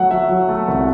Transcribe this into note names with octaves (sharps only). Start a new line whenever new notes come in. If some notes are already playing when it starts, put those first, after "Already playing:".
Already playing: F#3 A3 F#5
F#3 E5
F#3
A3
C2